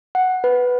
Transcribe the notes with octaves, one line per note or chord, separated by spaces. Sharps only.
F#5
B4